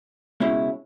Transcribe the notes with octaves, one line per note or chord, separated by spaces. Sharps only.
C#2 B2 G#3 C#4 E4